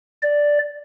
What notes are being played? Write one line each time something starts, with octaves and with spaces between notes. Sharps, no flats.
D5